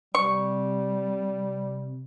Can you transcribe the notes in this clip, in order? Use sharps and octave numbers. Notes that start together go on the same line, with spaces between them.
C3 G3 C#6